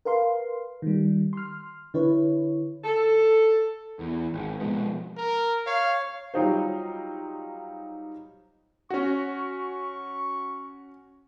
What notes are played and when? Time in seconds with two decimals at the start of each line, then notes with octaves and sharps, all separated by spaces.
0.05 A#4 B4 F5 C6
0.82 D#3 G3
1.33 C6 F6
1.94 D3 E4 B4 C#5
2.84 A4
3.99 E2
4.33 G#1
4.60 B2 F3 G#3 B3
5.17 A#4
5.66 C#5 F5
6.34 F#3 G3 D#4 F4 C5
8.90 C#4 F#4 C#6